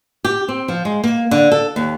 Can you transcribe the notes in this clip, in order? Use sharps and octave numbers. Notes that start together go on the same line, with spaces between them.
G4
C4
F3
G#3
A#3
D3
A4
D#2